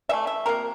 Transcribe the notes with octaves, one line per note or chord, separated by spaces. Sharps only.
E3 A3 E5
E5
C3 F3 A#3 A#4